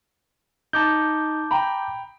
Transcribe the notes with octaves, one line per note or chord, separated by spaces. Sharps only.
D#4 A5 D6 G6
G5 A#5 B5